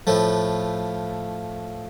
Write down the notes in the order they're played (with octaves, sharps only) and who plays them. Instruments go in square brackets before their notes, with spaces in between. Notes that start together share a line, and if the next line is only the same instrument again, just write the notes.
[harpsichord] A2 F3 A3